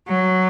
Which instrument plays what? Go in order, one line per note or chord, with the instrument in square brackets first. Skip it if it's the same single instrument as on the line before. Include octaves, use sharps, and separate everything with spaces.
[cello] F#3